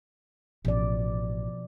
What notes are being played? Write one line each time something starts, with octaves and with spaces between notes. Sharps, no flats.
A1 B2 F3 D5